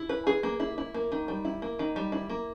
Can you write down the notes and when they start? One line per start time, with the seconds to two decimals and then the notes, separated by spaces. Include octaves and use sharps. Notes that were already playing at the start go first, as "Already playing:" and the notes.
Already playing: E4
0.09 B4
0.27 G#4
0.43 A#3
0.60 E4
0.78 E4
0.94 A#3
1.12 D#3
1.28 G3
1.45 E4
1.62 A#3
1.79 D#3
1.96 G3
2.12 E4
2.30 A#3